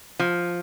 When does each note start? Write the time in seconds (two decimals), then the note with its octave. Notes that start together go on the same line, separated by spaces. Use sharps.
0.20 F3